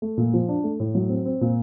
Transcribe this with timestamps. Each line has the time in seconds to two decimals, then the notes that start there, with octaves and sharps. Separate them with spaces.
0.02 A3
0.17 A#2
0.34 F3
0.49 D4
0.64 A3
0.80 A2
0.95 F#3
1.09 C4
1.26 C4
1.41 A#2